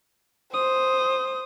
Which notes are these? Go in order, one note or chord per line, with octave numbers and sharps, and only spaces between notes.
C5 D#6